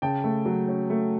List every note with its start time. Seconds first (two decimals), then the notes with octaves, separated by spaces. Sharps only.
0.02 C#3 G5 A5
0.24 A3
0.46 F#3
0.68 C#4
0.90 A3